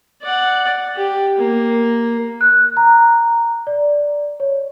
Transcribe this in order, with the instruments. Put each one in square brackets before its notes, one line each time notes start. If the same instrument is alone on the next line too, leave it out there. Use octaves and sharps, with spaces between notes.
[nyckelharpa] D5 F#5
G4
A#3
[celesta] F#6
A#5
D5
C#5